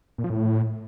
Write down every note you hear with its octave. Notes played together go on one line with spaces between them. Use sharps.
A#2
F3
A2